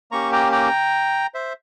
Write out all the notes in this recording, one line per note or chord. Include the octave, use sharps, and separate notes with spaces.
A#3 C#4 G4 A#5 C#6
G5 A#5
G5 A#5
C5 E5